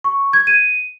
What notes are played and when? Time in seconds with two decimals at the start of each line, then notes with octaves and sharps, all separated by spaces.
0.04 C#6
0.33 G#6
0.47 D#7